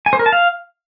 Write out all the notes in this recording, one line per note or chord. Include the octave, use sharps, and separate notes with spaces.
G#5
C5
A#4
A5
F5